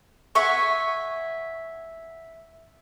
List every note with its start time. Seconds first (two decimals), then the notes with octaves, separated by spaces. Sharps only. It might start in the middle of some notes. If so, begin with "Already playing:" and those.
0.35 E5 F#5 G#5 C#6